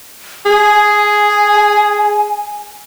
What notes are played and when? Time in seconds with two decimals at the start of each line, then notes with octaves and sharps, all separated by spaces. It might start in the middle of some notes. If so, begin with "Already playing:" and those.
0.46 G#4 G#5